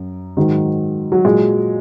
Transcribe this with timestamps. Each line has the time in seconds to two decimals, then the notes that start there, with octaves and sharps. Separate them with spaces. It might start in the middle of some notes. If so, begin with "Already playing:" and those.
Already playing: F#2
0.37 G#2 D#3 F#3
1.12 F#3
1.25 A#2 F#3 G#3